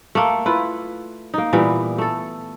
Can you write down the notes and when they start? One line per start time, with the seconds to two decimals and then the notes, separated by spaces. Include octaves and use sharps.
0.15 A3 A#3
0.46 E4 F4 B4
1.34 A#3 D#4
1.53 A#2 E3 G3 B3
1.98 A3 A4